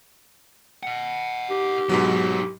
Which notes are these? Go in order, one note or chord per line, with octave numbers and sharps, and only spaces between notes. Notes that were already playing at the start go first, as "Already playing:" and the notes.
D#5 F#5
G4
G#2 B2 F#3 D#4 B4